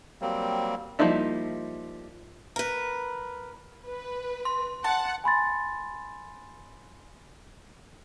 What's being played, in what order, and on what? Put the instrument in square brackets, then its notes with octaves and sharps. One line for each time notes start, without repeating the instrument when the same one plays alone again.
[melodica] F#3 G3 A#3 C4
[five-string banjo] F3 G3 A#3 D#4 E4
[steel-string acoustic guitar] A#4 B4
[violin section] B4
[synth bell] C6
[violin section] F#5 [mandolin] A5
[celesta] G#5 B5 C6 A6